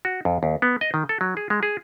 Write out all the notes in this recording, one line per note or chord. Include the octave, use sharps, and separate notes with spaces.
F#4
F2
D#2
B3
D#5
D#3
A4
F#3
G#4
G#3
G#4